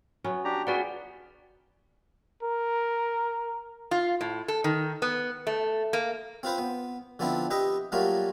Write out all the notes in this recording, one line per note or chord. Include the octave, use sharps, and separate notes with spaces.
F#3 B3 C#4
D4 G4 A#5
B3 F4 F#4 G#4 B4 D5 F#5 G5
A#4
F4
A2
A4
D#3
B3
A3
A#3
C4 F4 B4 C5
B3
D3 F3 B3 C4 D4 E4
G4 B4 D#5 E5 G5
F#3 G3 A3 A#3 F4 F#4